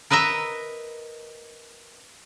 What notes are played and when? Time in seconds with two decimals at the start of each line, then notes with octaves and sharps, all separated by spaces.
0.10 A#4 B4 D#5 E5 A#5